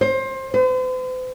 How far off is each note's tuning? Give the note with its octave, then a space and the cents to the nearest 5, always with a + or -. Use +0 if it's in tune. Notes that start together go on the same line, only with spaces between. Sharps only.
C5 +25
C5 -45